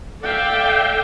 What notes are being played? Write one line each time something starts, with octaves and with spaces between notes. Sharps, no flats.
A4 D5 E5 F5 G5